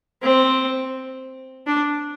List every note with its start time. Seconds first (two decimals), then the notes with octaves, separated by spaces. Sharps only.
0.22 C4
1.67 D4